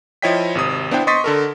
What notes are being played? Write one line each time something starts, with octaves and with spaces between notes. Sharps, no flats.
F3 E4 C#5 D#5 G5 B6
G#1 C3 D#6
B3 D4 E4 B4 C5 G5
D#5 C6 C#6 D#6 A6 B6
D3 A4 A#4